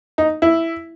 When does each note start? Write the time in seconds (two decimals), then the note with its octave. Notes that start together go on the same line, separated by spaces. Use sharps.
0.18 D#4
0.42 E4